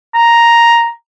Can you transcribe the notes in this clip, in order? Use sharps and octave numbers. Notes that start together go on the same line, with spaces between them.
A#5